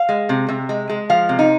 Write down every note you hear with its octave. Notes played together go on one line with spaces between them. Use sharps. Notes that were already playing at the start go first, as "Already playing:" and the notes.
Already playing: F5
G#3
C3
C3
G#3
G#3
F3 F5
C3
D#4